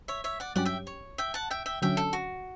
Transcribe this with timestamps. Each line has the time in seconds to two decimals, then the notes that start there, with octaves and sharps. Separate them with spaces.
0.08 C#5 E5
0.24 C#5 E5
0.40 D5 F#5
0.55 G2 F#3 C#4 G4 D5 F#5
0.65 E5 G5
0.87 C#5
1.18 E5 G5
1.34 F#5 A5
1.50 E5 G5
1.66 E5 G5
1.82 D3 F#3 C#4 E5 G5
1.97 A4
2.13 F#4